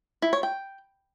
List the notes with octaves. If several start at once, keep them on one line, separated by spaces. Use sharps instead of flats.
E4
C#5
G5